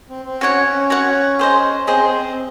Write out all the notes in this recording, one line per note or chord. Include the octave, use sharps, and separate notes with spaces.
C4
C4
C#4 F#4 C#5 F#5
C#4
F#4 C#5 F#5
G#4 C5 D#5
C4 G#4 C5 D#5